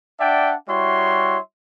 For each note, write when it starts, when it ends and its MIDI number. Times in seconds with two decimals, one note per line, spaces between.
0.19 0.55 62
0.19 0.55 74
0.19 0.55 76
0.19 0.55 78
0.19 0.55 79
0.19 0.55 81
0.68 1.37 55
0.68 1.37 64
0.68 1.37 66
0.68 1.37 73
0.68 1.37 76
0.68 1.37 84